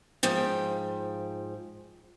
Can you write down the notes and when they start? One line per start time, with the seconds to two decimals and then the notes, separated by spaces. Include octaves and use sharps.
0.23 G#2 F3 G5